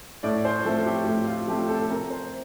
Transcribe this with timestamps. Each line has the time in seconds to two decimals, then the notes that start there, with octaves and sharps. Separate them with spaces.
0.23 A2 D5
0.45 C5
0.65 F3 A3 C4 A4
0.86 G4
1.06 A2 G4
1.27 F4
1.48 F3 A3 C4 G4
1.69 A4
1.90 C3 A#4
2.10 C5